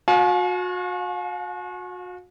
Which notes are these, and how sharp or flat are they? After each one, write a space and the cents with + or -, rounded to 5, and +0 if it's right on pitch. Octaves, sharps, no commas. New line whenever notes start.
F#4 -35 F5 +35 G#5 +45